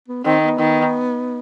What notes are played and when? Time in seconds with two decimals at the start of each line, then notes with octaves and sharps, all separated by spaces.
0.08 B3
0.25 D#3 C4
0.42 B3
0.59 D#3